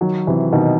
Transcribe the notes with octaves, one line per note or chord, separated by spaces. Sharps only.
D#3 F#3
C3 E3
B2 D#3